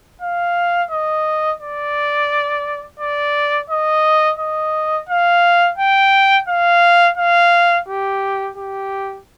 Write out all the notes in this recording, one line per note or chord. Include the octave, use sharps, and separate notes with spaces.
F5
D#5
D5
D5
D#5
D#5
F5
G5
F5
F5
G4
G4